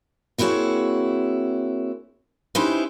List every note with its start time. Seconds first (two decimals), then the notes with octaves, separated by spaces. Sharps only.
0.38 A#3 C4 E4 F#4 G#4 C#5
2.55 C#4 D#4 E4 G4 B4 C5